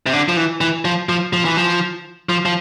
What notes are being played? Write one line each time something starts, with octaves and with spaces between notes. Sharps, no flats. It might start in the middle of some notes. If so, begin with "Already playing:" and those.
C3
D3
F3
E3
E3
F3
F3
F3
E3
F3
F3
F3